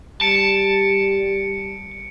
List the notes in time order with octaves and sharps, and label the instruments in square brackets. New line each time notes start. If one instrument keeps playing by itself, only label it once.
[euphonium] G3 [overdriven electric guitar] A5 [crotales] C#7 D7